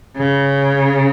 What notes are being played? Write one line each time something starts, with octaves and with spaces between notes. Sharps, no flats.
C#3